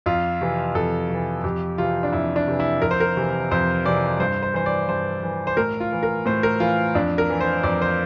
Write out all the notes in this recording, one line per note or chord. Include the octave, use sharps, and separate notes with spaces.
F2 F4
C3 E3
F2 A4
C3 E3
F2 G4
C3 E3 F4
D4
F2 E4
D4
C3 E3
E4
F2 A#4
C5
A#4
C3 E3
F2 C5
C3 E3 D5
G2 C5
C5
E3 C5
D5
G2 C5
E3
C5
A2 A#4
F4
E3
A#4
A2 C5
A#4
E3 F4
F2 D4
A#4
E3
C5
F2 D5
C5